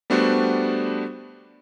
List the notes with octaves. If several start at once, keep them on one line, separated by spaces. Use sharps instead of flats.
G3 A3 B3 D4 F#4 C5